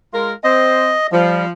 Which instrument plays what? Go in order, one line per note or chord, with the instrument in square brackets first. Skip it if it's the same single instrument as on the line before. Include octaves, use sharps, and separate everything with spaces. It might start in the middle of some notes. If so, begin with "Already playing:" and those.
[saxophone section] G#3 F4 A#4
[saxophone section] C4 C5 [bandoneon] D#5
[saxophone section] F3 [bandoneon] G3